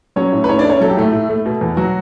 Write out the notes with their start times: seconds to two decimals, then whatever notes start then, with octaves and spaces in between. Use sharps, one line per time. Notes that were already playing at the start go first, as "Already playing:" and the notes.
0.16 F#3 C#4 C#5
0.33 A2
0.44 B4
0.49 A2 C#4 C#5
0.59 D4 D5
0.64 A3
0.70 C#4 C#5
0.81 F#3 A4
0.90 G4
0.97 A2 A3 A4
1.13 A2
1.29 A3
1.46 B2
1.61 E2
1.77 F#3 F#4